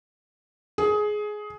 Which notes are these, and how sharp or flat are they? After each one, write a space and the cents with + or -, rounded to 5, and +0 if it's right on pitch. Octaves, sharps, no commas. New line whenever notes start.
G#4 +15